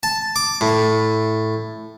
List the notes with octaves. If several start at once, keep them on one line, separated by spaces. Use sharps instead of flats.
A5
D6
A2